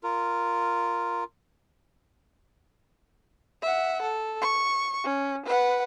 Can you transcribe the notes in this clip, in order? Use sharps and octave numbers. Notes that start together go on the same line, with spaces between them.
F4 A#4
E5 F#5
A4
C#6
C#4
B4 F#5